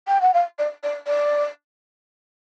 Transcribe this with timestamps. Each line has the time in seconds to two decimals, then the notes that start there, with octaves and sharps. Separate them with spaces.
0.07 G5
0.21 F#5
0.34 F5
0.59 D5
0.83 D5
1.07 D5